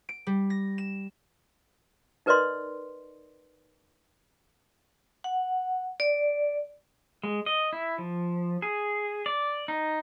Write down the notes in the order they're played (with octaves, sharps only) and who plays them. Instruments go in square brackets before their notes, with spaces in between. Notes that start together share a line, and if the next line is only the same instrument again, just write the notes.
[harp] D7
G3
A#6
E7
[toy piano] D#4 A#4 B4 D5 D#5 C6
[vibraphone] F#5
D5
[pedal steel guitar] G#3
D#5
E4
F3
G#4
D5
D#4